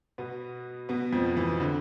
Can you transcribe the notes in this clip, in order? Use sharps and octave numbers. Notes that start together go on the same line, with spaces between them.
B2 B3
B2 B3
F2 F3
E3
D3